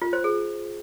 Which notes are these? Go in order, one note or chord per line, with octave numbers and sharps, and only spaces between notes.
F4
C5
G#4